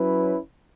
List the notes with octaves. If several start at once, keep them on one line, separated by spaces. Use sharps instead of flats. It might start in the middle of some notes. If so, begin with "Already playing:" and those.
Already playing: F#3 C#4 E4 B4